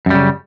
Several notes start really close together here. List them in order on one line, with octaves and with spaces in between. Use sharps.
F#2 G3 C#3